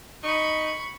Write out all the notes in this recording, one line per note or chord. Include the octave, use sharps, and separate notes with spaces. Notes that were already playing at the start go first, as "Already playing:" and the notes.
D#4 B5 C#6